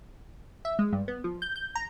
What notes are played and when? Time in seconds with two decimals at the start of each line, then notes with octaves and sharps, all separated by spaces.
0.65 E5
0.79 G#3
0.93 G2
1.08 B3
1.24 F3
1.42 G6
1.56 G6
1.75 A#5